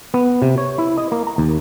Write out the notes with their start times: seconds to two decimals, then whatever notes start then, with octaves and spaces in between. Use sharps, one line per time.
0.14 B3
0.42 C3
0.58 C#5
0.78 E4
0.98 D#5
1.12 A#3
1.27 A#5
1.38 D#2